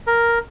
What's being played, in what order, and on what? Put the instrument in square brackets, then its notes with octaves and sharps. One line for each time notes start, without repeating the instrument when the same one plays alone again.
[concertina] A#4